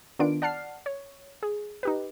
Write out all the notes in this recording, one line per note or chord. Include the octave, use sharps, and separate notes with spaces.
D#3 B3 D4 F4 D7
D5 F#5 A5 F6 C7
C#5
G#4
D#4 G4 B4